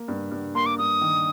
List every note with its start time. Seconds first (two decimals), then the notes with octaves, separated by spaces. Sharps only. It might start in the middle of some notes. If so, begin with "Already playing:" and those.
Already playing: A#3
0.08 G2
0.31 G2
0.55 A#3 C6
0.66 D6
0.78 G2 D#6
1.01 D#3